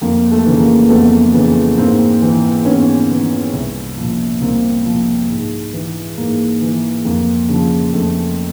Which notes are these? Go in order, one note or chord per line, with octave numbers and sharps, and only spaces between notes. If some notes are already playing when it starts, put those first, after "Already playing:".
F2 A#3
A3
C#3 E3
A#3
F2 A3 B3
C#3 E3
G#2 A#3 C4
E3
G#2 B3 C#4
E3
C2
A#2 F3
C2 A#3 C4
A#2 F3
G#2
E3
G#2 A#3
E3
F2 A#3
C#3 F3
F2 A3